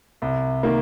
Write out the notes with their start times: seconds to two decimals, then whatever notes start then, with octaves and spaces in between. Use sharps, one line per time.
0.22 C2
0.63 D#3 A#3